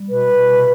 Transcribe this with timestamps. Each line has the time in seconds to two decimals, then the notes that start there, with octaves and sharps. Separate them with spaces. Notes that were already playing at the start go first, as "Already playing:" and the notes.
Already playing: G3
0.10 B2 B4
0.30 B2
0.48 C3